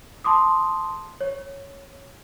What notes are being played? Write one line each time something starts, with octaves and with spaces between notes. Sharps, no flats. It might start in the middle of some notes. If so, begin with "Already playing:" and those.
A5 C6 D6 D#6
C#5